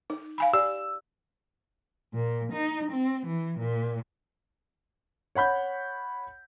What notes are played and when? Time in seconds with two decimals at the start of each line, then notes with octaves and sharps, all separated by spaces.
0.10 D#4
0.38 F5 G#5 B5
0.54 G4 D5 E6
2.13 A#2
2.53 D#4
2.92 C4
3.27 E3
3.59 A#2
5.35 C#5 F#5 B5 G6